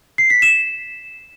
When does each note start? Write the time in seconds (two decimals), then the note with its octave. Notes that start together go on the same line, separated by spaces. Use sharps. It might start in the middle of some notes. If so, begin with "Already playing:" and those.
0.18 C7
0.30 B6
0.42 E7